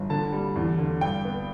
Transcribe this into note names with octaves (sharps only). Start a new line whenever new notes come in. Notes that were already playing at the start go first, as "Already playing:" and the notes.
Already playing: G1
D3 A5
G3
E2
D3
G2 G5
B3